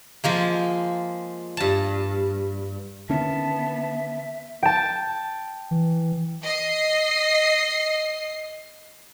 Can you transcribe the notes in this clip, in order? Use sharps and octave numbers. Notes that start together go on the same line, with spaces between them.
F3 G#3 A#3
G2 A5
D3 D#3 B3 C#4 E5 A5
G5 A5
E3
D#5 C7